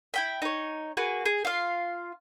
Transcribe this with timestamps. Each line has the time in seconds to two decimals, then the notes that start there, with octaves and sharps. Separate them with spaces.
0.14 E4 G5 B5
0.42 D#4 C#5
0.97 A#3 F#4 G#4 B4
1.25 G#4
1.45 F4 F5